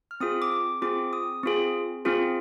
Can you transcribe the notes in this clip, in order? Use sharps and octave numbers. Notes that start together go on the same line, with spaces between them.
F6
C4 F4 G#4 D#6
D6
C4 F4 G#4 D6
D#6
C4 F4 G#4
C4 F4 G#4